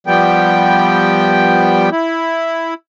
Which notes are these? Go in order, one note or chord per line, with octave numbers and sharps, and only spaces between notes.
F3 G3 B3 G5
E4